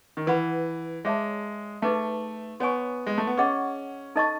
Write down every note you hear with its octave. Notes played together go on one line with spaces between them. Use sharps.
D#3
E3 B4 F#5 B5
G#3 G#4 C#5 E5 A5
A3 D#4 G#4 B4 E5
B3 F#4 C#5 G#5 C#6
G#3
A3
B3
C#4 G#4 D#5 F#5 C#6
D#4 A4 D#5 A5 C#6